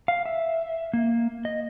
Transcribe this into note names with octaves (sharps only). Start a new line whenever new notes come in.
F5
E5
A#3
D#5